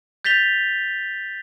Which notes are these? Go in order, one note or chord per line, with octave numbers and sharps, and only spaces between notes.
G6 A6 B6 F7 G7